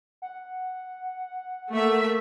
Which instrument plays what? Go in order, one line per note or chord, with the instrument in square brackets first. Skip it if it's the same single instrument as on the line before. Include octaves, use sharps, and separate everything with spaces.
[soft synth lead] F#5
[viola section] A3 A#3 E5